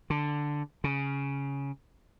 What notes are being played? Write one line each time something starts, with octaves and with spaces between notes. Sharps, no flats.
D3
C#3